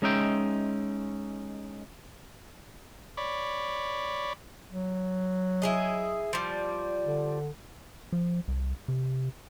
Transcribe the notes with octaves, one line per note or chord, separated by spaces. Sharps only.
G#3 C#4 D#4 E5 G5
C#5 D5 B5
F#3
E4 G#4 D#5
F3 G3
D3
F3
C2
C3